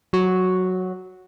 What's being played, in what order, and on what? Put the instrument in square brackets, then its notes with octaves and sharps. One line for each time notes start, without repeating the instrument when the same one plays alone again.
[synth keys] F#3 F#4